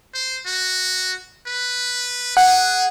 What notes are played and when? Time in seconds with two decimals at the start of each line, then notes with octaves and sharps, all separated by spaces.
0.14 C5
0.46 F#4
1.47 B4
2.37 G#4 F#5